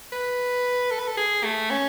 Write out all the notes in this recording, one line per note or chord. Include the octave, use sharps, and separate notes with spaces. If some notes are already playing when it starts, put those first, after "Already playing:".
B4
A4
B4
A4
G#4
A3
C#4